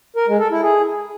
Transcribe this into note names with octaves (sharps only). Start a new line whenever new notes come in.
A#4
G#3
A4
E4
G#4